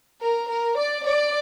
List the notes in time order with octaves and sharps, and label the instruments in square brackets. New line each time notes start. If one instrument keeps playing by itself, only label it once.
[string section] A#4
A#4
D5
D5